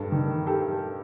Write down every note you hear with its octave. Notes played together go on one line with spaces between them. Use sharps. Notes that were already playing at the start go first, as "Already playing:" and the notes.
Already playing: G2 A4
D#3
G4 A4